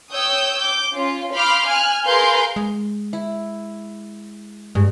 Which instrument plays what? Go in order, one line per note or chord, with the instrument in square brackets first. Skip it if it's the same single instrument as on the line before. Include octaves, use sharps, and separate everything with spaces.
[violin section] C#5 G5 D#6 E6 G6
D6 G6
C#4 F4
F5 B5 C6 D6 F6 G6
G#5 F6 F#6
G#4 A#4 B4 F5 C6 G6
[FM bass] G#3
[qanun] E4
[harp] G2 [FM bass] G#3